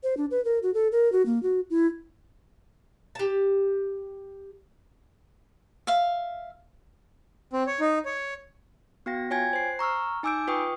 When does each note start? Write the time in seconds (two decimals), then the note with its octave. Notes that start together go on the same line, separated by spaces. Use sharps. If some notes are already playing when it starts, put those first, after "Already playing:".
0.03 C5
0.17 D4
0.31 B4
0.45 A#4
0.63 F#4
0.74 A4
0.92 A#4
1.12 F#4
1.26 A#3
1.43 F#4
1.70 E4
3.15 G4 A5
5.87 E5 F5
7.53 C4
7.67 C#5
7.80 D#4
8.05 C#5
9.06 B3 F#4 F5 G5 A#6
9.30 F4 C#5 G5 G#5 G#6
9.53 C5 C7
9.79 A#5 C#6 E6 F6
10.23 D#4 G#5 D6 E6 G6 D7
10.47 F4 B4 G5 C#6 D#6